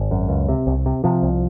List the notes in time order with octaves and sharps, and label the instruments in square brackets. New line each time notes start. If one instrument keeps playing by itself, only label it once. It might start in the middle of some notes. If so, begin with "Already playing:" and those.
Already playing: [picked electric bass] G#1
F#2
C#2
C3
C2
C3
C3 F3
C2